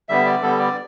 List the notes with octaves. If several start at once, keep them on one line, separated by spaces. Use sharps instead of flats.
D3 G3 B3 E5
D5
D3 G3 B3 A4
D5